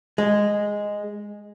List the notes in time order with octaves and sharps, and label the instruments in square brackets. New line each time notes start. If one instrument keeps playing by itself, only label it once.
[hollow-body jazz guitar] G#3